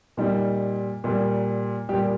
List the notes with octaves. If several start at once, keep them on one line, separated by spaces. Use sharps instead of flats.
A#2 G3 D#4
A#2 G3
A#2 G3 G4